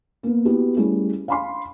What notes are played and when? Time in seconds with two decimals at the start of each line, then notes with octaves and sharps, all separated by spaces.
0.23 A#3 B3
0.45 B3 E4 F#4 G4
0.76 G3 A3 C#4 E4 G#4
1.28 F5 B5 C6